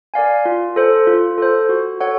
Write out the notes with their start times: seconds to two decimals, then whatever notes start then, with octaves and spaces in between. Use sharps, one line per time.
0.14 A#4 D5 F5 G#5
0.45 F4
0.76 A4 C5
1.07 F4
1.38 A4 C5
1.69 F#4
2.00 A4 C#5 F#5